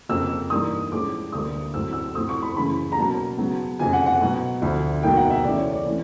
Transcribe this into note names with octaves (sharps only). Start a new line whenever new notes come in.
F2 C#3 F3 A#3 E6
G2 E3 G3 A#3 D#4 D#6
A2 F3 G#3 C#4 D6
D2 D3 G3 A#3 D#6
A2 F#3 A3 C4 E6
E6
A2 F3 A3 C4 D#6
C#6
B5
F#2 C#3 E3 B5
A#5
B2 F#3 A#3 C#4 A5
C#3 F#3 B3
F2 C#3 F3 G#5
F#5
F#5
B2 F#3 B3
D2 D3 F3
E2 B2 F#3 A#3 D#4 G5
F#5
E5
C#3 E3 A3 C#4 D5
C#5
D5
C3 E3 A3 C#4